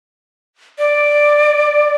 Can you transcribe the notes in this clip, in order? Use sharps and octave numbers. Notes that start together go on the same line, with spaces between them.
D5